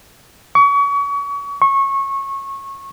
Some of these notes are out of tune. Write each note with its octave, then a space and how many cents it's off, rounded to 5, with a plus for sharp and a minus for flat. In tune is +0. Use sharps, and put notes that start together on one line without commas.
C#6 +35
C#6 -20